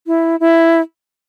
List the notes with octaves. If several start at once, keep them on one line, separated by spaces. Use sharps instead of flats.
E4
E4